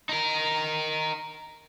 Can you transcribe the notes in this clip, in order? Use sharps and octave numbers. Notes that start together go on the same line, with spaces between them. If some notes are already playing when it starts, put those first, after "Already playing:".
D#4 A#4